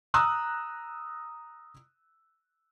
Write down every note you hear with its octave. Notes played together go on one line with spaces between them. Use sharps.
A#5 D#6 E6 F#6